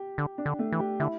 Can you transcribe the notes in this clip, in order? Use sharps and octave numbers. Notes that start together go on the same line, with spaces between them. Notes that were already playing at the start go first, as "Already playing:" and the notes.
Already playing: G4
D3
D4
D3
A3
E3
G4
D3 E4